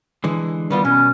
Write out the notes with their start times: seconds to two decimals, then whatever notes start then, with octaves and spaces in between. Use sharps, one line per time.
0.24 D3 E3 G#3
0.70 D#3 G3 B3 F4
0.85 B2 C#4